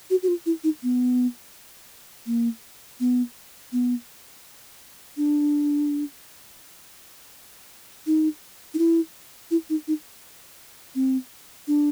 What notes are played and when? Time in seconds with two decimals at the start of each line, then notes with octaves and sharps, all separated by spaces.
0.10 F#4
0.23 F#4
0.28 F4
0.46 E4
0.64 D#4
0.83 B3
2.27 A#3
3.00 B3
3.72 B3
5.17 D4
8.07 D#4
8.74 D#4
8.78 E4
9.51 E4
9.70 D#4
9.88 D#4
10.95 C4
11.68 D4